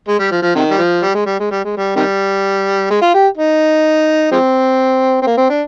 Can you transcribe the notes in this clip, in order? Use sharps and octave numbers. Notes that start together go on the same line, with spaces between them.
G#3
G3
F3
F3
C3 D#3
G3
F3
G3
G#3
G3
G#3
G3
G#3
G3
C3 D#3 G3
G#3
F4
G4
D#4
F3 G#3 C4
C4
A#3
C4
D4